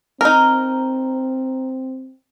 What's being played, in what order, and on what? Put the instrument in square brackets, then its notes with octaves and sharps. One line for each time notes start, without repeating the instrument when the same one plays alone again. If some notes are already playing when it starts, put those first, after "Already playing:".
[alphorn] C4 [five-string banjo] D#4 A#4